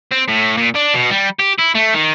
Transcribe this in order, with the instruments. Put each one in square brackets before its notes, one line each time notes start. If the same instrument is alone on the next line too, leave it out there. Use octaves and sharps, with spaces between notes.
[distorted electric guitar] C4
A2
A#2
D4
B2
G3
G4
E4
A3
D#3